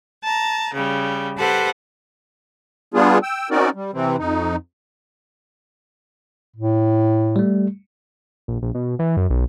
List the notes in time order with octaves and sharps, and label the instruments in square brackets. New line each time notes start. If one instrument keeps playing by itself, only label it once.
[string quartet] A5 A#5
C#3 G3
G4 A4 B4 C5 F#5
[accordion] G3 B3 D4 F4 G#4
G5 E6
C4 C#4 D#4 F#4 A#4 D5
G3
C3 E3 C4
F2 D#4
[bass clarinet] A2
[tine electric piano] G3 A3
[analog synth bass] A#1
A#1
B2
E3
F#2
B1